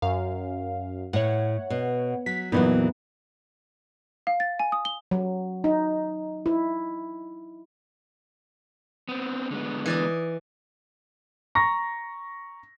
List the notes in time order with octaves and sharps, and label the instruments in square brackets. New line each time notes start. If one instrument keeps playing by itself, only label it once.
[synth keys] F#2 F5
[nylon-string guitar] A2 [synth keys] C#5 F#5
[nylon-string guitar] B2
[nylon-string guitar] F#3 [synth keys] B6
[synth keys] F2 B3 D#4 [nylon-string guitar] A#2 E3 F#3
[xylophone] F5
A6
G#5
D#6
G7
[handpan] F#3
D#4
E4
[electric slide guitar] B3 C4
D3 G#3 B3
[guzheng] E3 D5 D#5
[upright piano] A#5 C#6 A#6